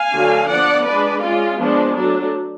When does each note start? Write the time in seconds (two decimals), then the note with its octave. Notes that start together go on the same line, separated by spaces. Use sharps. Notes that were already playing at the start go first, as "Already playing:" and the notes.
Already playing: F5 G#5
0.12 D3 F#3 A3 D4
0.48 F3 B3 D4 D5 F#5
0.85 G#3 D4 B4 D5
1.21 G#3 C#4 F4
1.58 F3 G#3 B3 D4
1.94 F#3 A3 D4